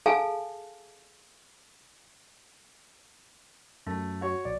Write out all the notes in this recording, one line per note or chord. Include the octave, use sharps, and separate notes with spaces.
G#4 A4 F5 G#5 A5
F#2 A3
F#4 C#5
A#1 D5